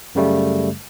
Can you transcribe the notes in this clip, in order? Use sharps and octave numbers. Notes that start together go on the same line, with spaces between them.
F#2 C#3 G3 A3